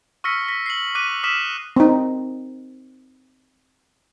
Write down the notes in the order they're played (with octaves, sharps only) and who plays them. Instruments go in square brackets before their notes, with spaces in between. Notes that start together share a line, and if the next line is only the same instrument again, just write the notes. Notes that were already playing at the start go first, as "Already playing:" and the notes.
[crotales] C#6 E6 F6 A#6 B6 C#7
A#6 B6
C7 F#7
D6 F#6 B6 D#7
D6 D#6 F6 B6 E7
[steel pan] C4 D#4